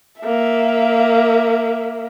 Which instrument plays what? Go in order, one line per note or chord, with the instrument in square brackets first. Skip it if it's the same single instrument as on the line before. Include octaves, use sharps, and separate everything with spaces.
[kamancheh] A#3 E5